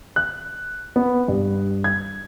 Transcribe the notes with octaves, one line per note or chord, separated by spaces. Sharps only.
F#6
B3
G2
G#6